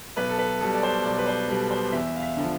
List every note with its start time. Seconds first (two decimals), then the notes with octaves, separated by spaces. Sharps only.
0.16 B1 B4
0.29 A4
0.39 B4
0.61 B2 G3 A4
0.74 D5
0.83 C5
1.04 B1 D5
1.18 B4
1.27 C5
1.49 B2 G3 A4
1.71 C5
1.92 E2 E5
2.16 F5
2.22 E5
2.37 D3 F3